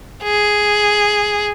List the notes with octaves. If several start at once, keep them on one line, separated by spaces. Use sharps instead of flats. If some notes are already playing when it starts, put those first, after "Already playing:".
G#4